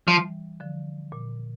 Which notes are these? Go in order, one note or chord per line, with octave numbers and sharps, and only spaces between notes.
E3 F3 G3
D3 F3
A#2